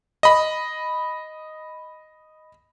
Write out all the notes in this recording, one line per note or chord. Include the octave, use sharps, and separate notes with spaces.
D#5 B5